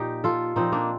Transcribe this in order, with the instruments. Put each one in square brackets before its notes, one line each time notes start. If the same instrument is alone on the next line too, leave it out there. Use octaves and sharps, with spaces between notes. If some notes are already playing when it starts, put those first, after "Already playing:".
Already playing: [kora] A#2 F3 D#4 G4
F4 A4
A#2 F3 C4 D#4
A#3 D4